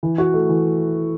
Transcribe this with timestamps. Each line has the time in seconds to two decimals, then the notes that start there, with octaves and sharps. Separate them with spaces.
0.03 E3
0.18 F#4
0.34 A3
0.49 E3